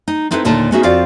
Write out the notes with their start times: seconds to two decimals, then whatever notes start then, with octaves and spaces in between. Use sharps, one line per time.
0.08 D#4
0.31 B3 C4 D#4 E4 A4 B4
0.45 D#2 A#2 D3 D#4 A5
0.72 B3 C#4 D#4 F#4 G#4 E5
0.83 F2 C4 F4 F#4 D5 F5